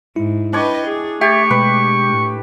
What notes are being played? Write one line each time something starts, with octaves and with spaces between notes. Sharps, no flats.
G#2 E4
D4 B4 C#5 D#5 G5
G#4
A3 G4 E5 C#6 G#6 A6
B2 G#3 B4
A2